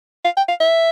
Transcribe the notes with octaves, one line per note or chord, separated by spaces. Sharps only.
F5
G5
F5
E5